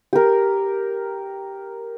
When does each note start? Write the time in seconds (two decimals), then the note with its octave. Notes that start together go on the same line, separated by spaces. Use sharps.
0.13 G4 A#4